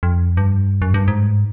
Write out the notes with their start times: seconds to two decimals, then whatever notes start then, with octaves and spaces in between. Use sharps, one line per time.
0.03 F2
0.37 G2
0.82 F#2
0.94 G2
1.08 G#2